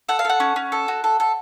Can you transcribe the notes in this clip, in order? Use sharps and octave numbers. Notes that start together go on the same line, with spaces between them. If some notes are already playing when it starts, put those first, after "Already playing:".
A4 F#5
F5
A4 F#5
C#4
C#4
A4
F#4
A4
A4